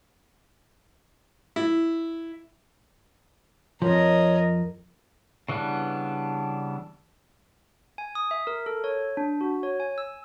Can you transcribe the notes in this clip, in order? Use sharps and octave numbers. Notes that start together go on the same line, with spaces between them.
E4
F2 F3 A#4 C#5 D#5
C#3 E3 G3 B3 D4
G#5
D#6
E5
A#4
A4
C#5
D4
F#4
C#5
G#5
E6